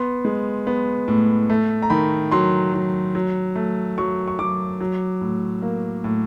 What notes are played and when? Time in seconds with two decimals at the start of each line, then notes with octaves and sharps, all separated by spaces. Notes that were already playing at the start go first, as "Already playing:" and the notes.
Already playing: B3 C6
0.25 G#3
0.67 B3
1.08 A2
1.50 A3
1.82 A#5
1.90 D#3 B5
2.31 F#3 C6
2.74 F#3
3.15 F#3
3.56 A3
3.98 F#3 C#6
4.28 C#6
4.39 F#3 D6
4.81 F#3
5.21 A2
5.62 A#3
6.04 A2